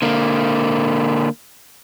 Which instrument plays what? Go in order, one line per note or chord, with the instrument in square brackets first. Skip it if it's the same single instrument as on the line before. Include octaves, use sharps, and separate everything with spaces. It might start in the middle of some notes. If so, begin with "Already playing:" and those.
[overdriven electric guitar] D3 A#3